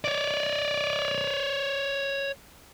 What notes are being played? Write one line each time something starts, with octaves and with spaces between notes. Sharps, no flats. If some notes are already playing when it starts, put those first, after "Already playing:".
C#5 D5